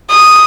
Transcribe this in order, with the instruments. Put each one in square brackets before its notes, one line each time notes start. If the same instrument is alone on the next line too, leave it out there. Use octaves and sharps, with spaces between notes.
[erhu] D#6